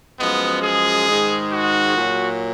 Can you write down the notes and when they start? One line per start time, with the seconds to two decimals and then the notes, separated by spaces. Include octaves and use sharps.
0.19 F#2 F3 G#3 B3
0.63 G#4
1.07 G#2 D#3 G#3
1.51 F#4
1.94 A#2 F#3